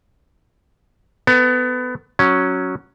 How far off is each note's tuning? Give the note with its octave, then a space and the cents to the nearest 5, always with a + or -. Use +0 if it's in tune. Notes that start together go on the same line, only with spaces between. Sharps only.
B3 +25 A4 +35
F#3 +0 C#4 +0